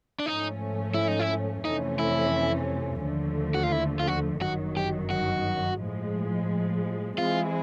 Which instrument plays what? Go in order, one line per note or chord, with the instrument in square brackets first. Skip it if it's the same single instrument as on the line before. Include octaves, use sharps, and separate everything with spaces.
[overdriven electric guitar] D4
[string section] G#2 F3 A3 C#4 [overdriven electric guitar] D#4
[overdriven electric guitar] E4
D#4
E4
[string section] F2 C3 E3 A3 C#4 [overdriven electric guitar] D#4
[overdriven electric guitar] E4
[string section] D#2 D3 F3 A3
[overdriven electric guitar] F#4
F4
E4
F4
F#4
[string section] G1 F#2 D#3 F#3 [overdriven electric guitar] F#4
[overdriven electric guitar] G4
F#4
[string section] A2 F3 G#3
[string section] E3 G#3 C4 E4 G#4 [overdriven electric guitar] F4